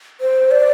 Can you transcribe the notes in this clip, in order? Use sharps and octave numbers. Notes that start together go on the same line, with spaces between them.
C5
D5